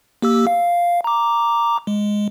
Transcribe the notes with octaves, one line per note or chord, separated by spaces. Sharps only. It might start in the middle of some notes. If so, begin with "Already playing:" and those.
A#3 G4 E6
F5
A#5 D6
G#3